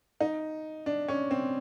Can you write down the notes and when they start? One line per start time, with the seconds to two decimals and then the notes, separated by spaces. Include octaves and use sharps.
0.21 D#4
0.86 D4
1.08 C#4
1.31 C4